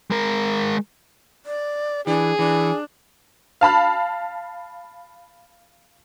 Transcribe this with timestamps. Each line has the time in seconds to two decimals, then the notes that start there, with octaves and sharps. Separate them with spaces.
0.11 G#3 A#4
1.46 D5
2.07 E3 D4 G#4
2.39 E3 D4
3.61 F5 A5 B5 F6